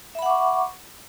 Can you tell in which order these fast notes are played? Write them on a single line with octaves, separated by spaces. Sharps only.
E5 B5 F#5 D6 C#6